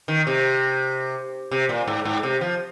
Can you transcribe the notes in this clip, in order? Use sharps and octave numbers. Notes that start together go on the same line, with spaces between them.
D#3
C3
C3
A#2
G#2
G#2
C3
F3